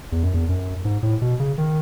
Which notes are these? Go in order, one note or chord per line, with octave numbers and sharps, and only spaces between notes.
E2
F#2
E2
F#2
G#2
A2
B2
C#3
D#3